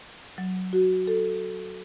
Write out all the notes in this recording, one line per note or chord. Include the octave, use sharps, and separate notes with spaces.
F#3
F#4
A4